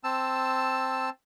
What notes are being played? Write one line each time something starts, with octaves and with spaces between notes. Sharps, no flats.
C4 A5 E6